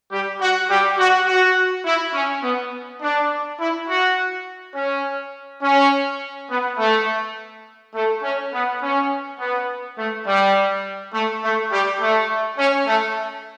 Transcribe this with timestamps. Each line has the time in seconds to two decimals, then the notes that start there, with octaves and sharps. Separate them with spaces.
0.11 G3 G4
0.41 F#4
0.69 G3 G4
0.99 F#4
1.28 F#4
1.86 E4
2.14 C#4
2.43 B3
3.01 D4
3.60 E4
3.88 F#4
4.75 C#4
5.62 C#4
6.50 B3
6.79 A3
7.95 A3
8.23 C#4
8.53 B3
8.82 C#4
9.39 B3
9.97 A3
10.26 G3
11.13 A3
11.43 A3
11.72 G3 G4
12.01 A3
12.58 C#4
12.87 A3